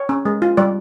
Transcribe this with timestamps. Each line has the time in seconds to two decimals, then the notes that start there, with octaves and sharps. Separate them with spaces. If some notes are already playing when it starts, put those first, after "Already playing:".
Already playing: C#5
0.09 C#4
0.25 G#3
0.42 F4
0.57 G3 D5